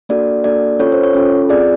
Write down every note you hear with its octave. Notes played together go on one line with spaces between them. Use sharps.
A#3 D4 F#4 A4 D5
A#3 D4 F#4 A4 D5
C#4 F4 A4 C#5
C5
C#5
C#4 F4 A4
C4 F4 G#4 D5